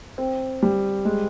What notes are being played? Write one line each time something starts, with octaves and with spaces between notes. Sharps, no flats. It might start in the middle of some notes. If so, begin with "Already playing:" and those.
C4
G3
G#3